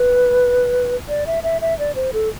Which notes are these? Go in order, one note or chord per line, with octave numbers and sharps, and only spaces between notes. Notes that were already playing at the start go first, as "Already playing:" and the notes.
Already playing: B4
D5
E5
E5
E5
D5
C5
A4